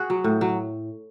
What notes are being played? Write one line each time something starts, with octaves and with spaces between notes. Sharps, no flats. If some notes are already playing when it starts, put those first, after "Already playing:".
Already playing: F#4 G#4
F#3
A2
F#3